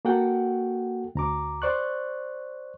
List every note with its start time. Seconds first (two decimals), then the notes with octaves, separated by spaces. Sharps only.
0.05 A#3 F#4 A4 F#5 G5
1.15 D2 A#5 D6
1.62 C5 D5 C#6 F#6